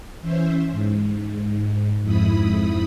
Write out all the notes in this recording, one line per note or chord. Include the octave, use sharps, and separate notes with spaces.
E3 C#4 C5 E5
G#2
F2 G#2 E4 B5 D#6